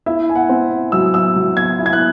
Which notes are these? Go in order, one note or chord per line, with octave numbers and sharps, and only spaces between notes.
E4 E5
G#5
F#5
C4
F#3 E6
E6
F#3
G#6
E4
G#6
F#6